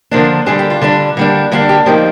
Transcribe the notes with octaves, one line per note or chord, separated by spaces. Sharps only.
D3 F3 A#3 D4
D3 G3 D4 G#4
G4
F4
D3 G3 D4
D3 G3 A#3 D4
D3 G3 A#3 D4 F4
G4
F3 A#3 D#4 G4